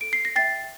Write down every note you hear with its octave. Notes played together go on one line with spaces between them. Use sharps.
A4 D7
C7
A#6
E5 G5 A6 C7